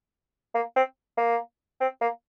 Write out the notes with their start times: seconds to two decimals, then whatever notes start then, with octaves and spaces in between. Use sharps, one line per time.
0.55 A#3
0.76 C4
1.17 A#3
1.81 C4
2.01 A#3